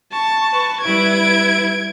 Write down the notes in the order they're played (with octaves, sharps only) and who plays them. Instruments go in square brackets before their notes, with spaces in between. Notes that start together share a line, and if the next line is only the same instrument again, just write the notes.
[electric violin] A5 [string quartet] C#6
[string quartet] B4 C#6
[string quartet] G3 E4 B4 [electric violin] G#6 D7